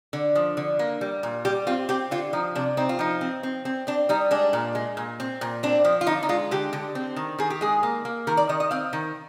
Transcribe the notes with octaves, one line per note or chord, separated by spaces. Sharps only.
D3
F3
D3
A#3
G3
A#2
G3 G4
C4 F4
C4 G4
D3 F4
F3 D#4
C3 D4
C4 D#4
F4
F3 D#4
C4
C4
C4
C4 D4
G3 D#4
G#3 D4
A#2
G#3
A#2
C4
A#2
C4 D4
F3
F4
D3 D#4
D#4
G#3 F4
D3 G4
D3
C4
D#3
D#3 G#4
G4
G#3 G#4
A#3
A#3
D#3 A#4
D5
D#3 D#5
D#5
C4 F5
D#3